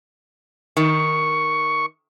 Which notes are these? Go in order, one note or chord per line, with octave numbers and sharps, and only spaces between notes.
D#3 C#6